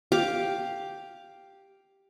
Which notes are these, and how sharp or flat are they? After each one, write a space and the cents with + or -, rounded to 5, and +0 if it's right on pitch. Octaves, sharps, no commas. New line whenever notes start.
G4 +0 F5 +0 D6 +0